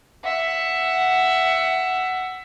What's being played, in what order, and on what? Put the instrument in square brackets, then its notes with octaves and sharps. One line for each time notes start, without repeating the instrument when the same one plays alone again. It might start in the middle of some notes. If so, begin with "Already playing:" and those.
[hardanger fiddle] E5 F#5